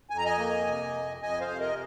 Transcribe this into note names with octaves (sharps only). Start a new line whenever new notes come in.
F2 G#5
A#5
D#5 G#5
A#3
C3
F2
F2 D#5 G#5
C5 F5
C3
A#4 D#5